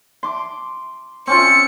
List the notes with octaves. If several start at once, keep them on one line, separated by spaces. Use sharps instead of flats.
C6 D6
C4 C#4 F4 C#7